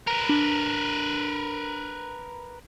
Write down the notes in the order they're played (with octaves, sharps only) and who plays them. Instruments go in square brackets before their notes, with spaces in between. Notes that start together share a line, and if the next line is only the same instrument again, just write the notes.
[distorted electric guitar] A#4 B4 [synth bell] A#5
[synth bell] D4